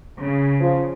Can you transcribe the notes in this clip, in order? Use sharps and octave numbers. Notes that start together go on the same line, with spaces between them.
C#3
F3